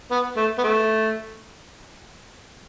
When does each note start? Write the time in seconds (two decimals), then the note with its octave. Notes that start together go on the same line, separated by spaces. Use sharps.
0.11 B3
0.37 A3
0.58 B3
0.64 A3